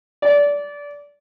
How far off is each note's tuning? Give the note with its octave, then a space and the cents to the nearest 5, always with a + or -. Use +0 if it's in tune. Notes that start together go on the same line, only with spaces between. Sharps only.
D5 -20